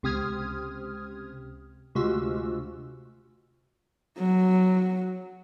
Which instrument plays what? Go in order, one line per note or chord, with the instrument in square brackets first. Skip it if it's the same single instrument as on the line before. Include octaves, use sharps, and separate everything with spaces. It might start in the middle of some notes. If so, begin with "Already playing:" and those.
[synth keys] C#2 C3 C4 D#6 F6 G#6
D2 C3 G#3 F4 F#4 E6
[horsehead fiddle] F#3